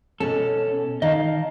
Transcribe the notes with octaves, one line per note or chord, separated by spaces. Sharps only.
B2 C#4 A4
D#3 D#5 F5 A5